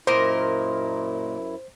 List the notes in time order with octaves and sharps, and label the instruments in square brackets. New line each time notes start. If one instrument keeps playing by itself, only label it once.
[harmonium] F#2 E4 [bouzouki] A#2 A#4 D#5 [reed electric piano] C5